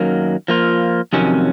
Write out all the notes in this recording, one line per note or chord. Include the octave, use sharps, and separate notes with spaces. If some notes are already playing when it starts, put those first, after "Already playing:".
Already playing: F#2 D#3 F#3 A#3
F3 A#3 F4
F2 C3 D#3 F#3 C#4